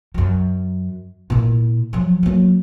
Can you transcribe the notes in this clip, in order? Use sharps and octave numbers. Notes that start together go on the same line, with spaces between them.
F#2 F#3
A#2 E4
F3 F#3
F#3 A#3